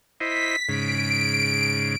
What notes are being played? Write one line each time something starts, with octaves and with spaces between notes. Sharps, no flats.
E4 C5 D#5 B6
G#2 C#3 D7